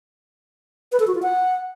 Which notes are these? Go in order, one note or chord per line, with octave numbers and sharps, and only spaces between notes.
B4
A4
F#4
F4
F#5